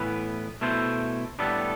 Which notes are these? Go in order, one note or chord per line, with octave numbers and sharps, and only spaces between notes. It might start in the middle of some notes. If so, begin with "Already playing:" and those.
Already playing: A2 E3 B3 E4 B4
B2 A3 E4 A4 C5
A2 G3 B3 D4 A4